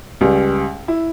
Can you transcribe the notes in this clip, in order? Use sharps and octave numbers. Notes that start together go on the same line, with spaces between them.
C#2 G3
E4